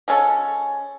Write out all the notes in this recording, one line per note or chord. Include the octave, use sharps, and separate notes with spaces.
F3 G#3 C#4 A4